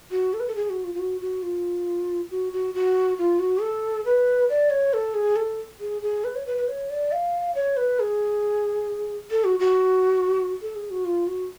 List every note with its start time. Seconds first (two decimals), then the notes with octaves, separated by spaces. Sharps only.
0.11 F#4
0.33 A4
0.40 B4
0.48 A4
0.55 G#4
0.70 F#4
0.84 F4
0.95 F4
1.00 F#4
1.21 F#4
1.43 F4
2.31 F#4
2.53 F#4
2.74 F#4
3.18 F4
3.39 F#4
3.61 A4
4.05 B4
4.50 D5
4.70 C#5
4.93 A4
5.14 G#4
5.36 A4
5.80 G#4
6.02 G#4
6.24 B4
6.36 C#5
6.46 B4
6.57 B4
6.68 C#5
6.90 D5
7.12 F5
7.55 C#5
7.77 B4
8.00 G#4
9.31 A4
9.44 F#4
9.60 F#4
10.62 A4
10.76 G#4
10.91 F#4
11.05 F4
11.27 F#4